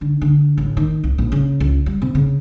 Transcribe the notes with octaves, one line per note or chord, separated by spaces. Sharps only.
D3
D3
A1
D#3
C2
A#1
C#3
C#2
G3
C3
C#3